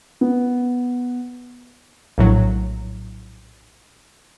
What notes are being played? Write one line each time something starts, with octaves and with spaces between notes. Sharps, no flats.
B3
A#1 A2 F#3